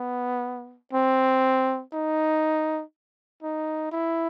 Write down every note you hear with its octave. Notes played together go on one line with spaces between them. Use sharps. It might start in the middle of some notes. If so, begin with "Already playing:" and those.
Already playing: B3
C4
D#4
D#4
E4